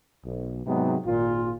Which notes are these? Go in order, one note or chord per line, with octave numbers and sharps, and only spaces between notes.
B1
G#2 C3 F#3 G#3 B3 D#4
G#1 A#2 F4